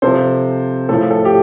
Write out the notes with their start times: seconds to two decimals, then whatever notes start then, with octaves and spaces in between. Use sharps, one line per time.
0.02 C3 F3 A4 C5
0.89 A2 F3 A4
1.11 A4
1.25 G4